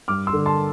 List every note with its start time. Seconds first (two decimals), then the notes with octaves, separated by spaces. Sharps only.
0.08 G2 D6 F6
0.27 C6 E6
0.33 D3
0.46 A5 C6